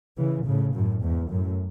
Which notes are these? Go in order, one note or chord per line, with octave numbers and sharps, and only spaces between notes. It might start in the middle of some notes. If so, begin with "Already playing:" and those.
C#3 E3
A2 C#3
F#2 A2
E2 G#2
F#2 A2